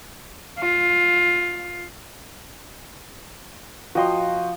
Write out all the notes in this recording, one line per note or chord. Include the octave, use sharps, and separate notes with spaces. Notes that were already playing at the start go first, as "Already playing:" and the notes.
F4
F3 F#4 D#5 G5 C6